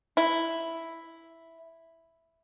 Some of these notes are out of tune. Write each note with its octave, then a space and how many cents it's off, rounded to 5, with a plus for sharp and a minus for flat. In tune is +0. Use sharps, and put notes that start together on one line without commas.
E4 +0